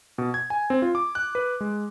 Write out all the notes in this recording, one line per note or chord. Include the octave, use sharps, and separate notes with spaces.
B2
G#6
G#5
C4
F4
D6
F#6
B4
G#3